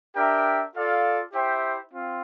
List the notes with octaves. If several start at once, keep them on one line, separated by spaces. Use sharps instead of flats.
D4 G4 A#4 E5 G5
F4 A4 D5 F5
E4 G4 C5 E5 G5
C4 F4